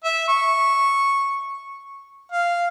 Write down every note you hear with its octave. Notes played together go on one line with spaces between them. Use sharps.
E5
C#6
F5